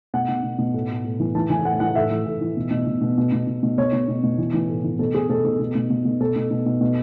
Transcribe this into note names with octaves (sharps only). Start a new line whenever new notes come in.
B2 F#5
B2
B2
B2
A2
A2
A2
E3
E3 A5
E3 G#5
A2 F#5
E3 F#5
A2 E5
E3
A2
E3
B2
B2
B2
B2
B2
B2
B2
B2
B2 C#5
B2
B2
B2
E3
E3
A2
E3
B2 A4
B2 G#4
B2 A4
B2 A4
B2
B2
B2
B2
B2 A4
B2
B2
B2
B2